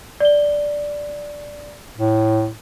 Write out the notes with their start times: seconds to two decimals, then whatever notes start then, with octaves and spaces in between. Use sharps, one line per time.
0.20 D5 G7
1.98 A2